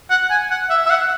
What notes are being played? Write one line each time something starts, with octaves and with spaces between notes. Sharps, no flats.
F#5
G#5
F#5
E5
E5
F#5